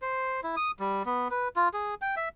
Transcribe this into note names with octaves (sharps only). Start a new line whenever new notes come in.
C5
E4
D#6
G3
B3
B4
F4
G#4
G5
E5